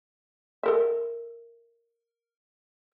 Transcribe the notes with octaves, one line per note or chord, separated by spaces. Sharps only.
A4 A#4 E5